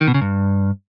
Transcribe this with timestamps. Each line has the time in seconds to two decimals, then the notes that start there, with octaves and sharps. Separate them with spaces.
0.01 D#3
0.07 B2
0.14 C#3
0.21 G2